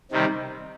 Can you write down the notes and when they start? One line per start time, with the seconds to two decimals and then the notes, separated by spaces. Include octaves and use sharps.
0.11 C3 D#3 G3